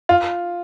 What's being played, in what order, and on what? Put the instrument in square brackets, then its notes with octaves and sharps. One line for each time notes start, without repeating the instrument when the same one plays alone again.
[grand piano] F4